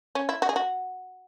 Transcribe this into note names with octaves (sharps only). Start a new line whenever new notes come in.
C#4
E4
F#4
G#4
F#4